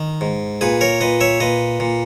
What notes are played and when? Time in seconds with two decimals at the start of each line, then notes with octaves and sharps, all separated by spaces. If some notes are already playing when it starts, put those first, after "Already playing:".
Already playing: D#3
0.21 G#2
0.61 A#2 G#4 B4
0.81 A#4 C#5
1.01 A#2 B4 D#5
1.21 C#5 E5
1.40 A#2 B4 D#5
1.80 A#2